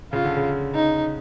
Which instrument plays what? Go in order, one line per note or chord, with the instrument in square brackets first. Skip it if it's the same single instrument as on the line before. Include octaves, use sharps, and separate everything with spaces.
[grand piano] C#3 [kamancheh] F4
[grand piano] D3
C#3
[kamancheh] D#4